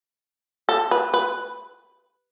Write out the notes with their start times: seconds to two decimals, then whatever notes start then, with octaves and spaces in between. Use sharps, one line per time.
0.69 A4
0.91 B4
1.14 B4